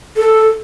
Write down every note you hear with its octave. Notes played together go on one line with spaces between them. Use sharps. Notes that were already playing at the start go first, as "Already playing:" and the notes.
A4